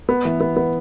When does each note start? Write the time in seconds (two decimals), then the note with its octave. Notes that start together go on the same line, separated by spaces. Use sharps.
0.09 B3
0.25 E3
0.40 B3
0.56 B3